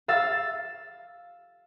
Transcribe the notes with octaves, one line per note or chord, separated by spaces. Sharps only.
F5 E6 A6